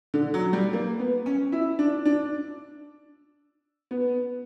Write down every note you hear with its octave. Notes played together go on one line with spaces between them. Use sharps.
D3
F#3
G3
A#3
B3
C#4
E4
D4
D4
B3